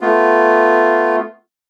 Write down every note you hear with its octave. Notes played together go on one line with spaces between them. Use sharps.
A3 B3 F4